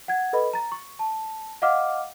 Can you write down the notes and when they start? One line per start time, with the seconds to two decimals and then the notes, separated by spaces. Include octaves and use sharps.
0.08 F#5 G#6
0.33 A4 B4 D#5 B5
0.53 A#5 A6
0.72 C#6
0.99 A5
1.62 D#5 F5 F#5 D6 F6